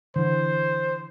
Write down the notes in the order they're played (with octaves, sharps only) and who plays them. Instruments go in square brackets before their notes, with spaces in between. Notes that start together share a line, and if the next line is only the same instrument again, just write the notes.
[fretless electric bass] D3 E3 [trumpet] C5